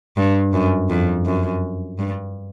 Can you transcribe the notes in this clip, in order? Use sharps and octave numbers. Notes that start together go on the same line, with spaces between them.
G2
F#2
F2
F#2
G2